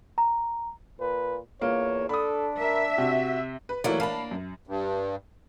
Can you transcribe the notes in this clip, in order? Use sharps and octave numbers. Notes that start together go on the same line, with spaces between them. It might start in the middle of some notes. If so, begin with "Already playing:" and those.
A#5
A#2 B4
E2 A#3 F4 C#5
D4 A4 B5 D#6
A#4 E5
C3 F#4
B4
E3 F#3 A3 A#3 E4 D5
A#3 D4 F5 A5 B5
F#2
G2